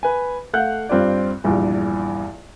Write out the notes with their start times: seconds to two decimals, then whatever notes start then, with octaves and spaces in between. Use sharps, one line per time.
0.03 B4 G#5
0.53 A3 F5 F#5 F#6 G6
0.89 G2 C4 F4 D5
1.44 A#1 E2 G2